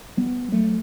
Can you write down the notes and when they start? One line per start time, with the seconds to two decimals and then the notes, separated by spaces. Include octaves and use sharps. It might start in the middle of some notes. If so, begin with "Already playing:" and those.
0.17 G3 B3
0.52 F#3 A3